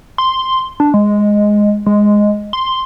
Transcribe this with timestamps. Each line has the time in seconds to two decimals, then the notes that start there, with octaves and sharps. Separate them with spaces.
0.18 C6
0.80 D4
0.94 G#3
1.86 G#3
2.53 C6